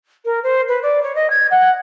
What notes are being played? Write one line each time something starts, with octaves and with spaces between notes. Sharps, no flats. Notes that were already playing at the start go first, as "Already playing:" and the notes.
A#4
C5
B4
D5
C#5
D#5
G#6
F#5